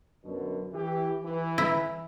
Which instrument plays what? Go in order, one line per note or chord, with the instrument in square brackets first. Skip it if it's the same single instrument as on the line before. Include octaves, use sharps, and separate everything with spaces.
[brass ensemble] F#2 B2 D3
E3 G4
E3
[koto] E4